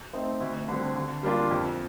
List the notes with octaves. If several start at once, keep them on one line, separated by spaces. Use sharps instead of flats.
A3 C4 D#4
D2
D3 G3 C4
D3
G3 A#3 D4 F4
F2